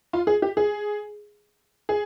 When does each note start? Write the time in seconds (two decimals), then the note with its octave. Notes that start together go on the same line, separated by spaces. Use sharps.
0.13 F4
0.27 G#4
0.42 G4
0.57 G#4
1.89 G#4